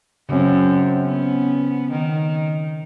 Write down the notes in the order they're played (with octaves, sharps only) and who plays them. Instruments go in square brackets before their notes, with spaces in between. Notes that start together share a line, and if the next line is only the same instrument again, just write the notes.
[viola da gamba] F#2 [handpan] C#3 C4
[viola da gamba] B3 C#4
D#3